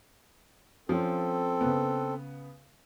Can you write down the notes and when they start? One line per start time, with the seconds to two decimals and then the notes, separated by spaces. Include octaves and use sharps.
0.89 F3 C4 C#4 A4
1.61 C#3 B3